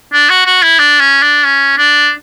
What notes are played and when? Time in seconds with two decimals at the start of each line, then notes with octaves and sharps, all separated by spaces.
0.13 D4
0.30 F#4
0.46 F#4
0.63 E4
0.79 D4
1.00 C#4
1.22 D4
1.45 C#4
1.78 D4